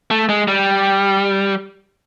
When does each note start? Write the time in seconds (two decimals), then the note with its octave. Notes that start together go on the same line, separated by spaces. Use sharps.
0.11 A3
0.29 G#3
0.48 G3